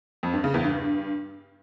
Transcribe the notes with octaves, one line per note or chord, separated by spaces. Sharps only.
F2
G2
C#3
E2
G2